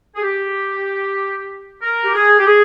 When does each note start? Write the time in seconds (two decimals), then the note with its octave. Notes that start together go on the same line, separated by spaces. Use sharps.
0.15 G#4
0.23 G4
1.82 A#4
2.04 G4
2.14 G#4
2.39 G4
2.46 G#4